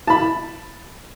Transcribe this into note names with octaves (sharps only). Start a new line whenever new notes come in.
A5 B5